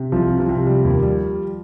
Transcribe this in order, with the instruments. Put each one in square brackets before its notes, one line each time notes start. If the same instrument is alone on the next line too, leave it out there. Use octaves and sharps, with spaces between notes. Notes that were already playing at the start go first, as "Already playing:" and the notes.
Already playing: [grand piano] C3
[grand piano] C2 [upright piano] F3
[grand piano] C3
[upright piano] F3
[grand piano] C3
G3
D#2
G3